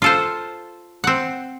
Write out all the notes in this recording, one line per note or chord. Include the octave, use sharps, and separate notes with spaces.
F4 A4 C5
C4 F#5